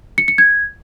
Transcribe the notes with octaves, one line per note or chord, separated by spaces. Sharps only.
C#7
C#7
G#6